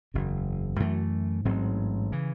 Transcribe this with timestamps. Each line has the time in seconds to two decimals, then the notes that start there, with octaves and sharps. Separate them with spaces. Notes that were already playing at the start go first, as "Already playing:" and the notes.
0.14 F#1 E2 C#3
0.80 F#2 E3 A3
1.45 A1 G#2 F#3 C4
2.12 C#3 E3